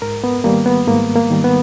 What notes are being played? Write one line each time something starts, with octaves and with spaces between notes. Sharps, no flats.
G#2 A#4
B3
D#3 G3 A#3
B3
G#2 A#3
A#3
D#3 G3
B3